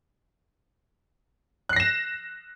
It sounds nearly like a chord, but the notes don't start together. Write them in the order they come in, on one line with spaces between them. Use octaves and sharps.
F#6 C7 A#6 E7